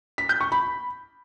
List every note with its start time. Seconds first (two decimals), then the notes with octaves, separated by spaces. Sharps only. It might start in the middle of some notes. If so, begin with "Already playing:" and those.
0.18 B6
0.29 G6
0.41 C#6
0.52 B5